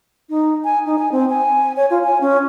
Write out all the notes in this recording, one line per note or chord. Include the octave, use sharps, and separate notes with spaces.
D#4
G#5
D#4
G#5
C4
G#5
C#5
F4
G#5
C#4